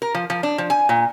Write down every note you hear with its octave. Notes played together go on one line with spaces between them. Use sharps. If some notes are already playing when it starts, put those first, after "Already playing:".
A#4
F3
F3
D4
F3
G#5
A#2